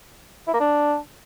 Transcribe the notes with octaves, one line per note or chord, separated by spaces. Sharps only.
E4
A#3
D4